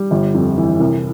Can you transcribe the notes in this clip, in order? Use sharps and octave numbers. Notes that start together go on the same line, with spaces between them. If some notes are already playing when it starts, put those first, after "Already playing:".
Already playing: G3
G1
F2
E3
C2